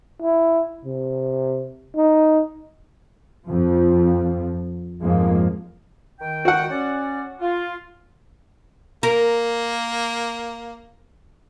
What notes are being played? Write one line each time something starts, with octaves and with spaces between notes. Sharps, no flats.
E4
C3
D#4
F2 F3
F2 G#2 F3 G#3 A#3
D#3 G5
F#4 F#5
C#4 D5
F4
A#3 A#4